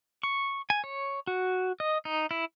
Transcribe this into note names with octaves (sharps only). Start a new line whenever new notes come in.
C#6
G#5
C#5
F#4
D#5
D#4
E4